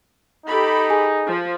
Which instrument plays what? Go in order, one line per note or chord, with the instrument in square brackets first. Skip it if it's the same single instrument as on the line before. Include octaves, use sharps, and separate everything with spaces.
[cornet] D#4 [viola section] G4 A4 B5
[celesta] G#4 G#5
[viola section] F3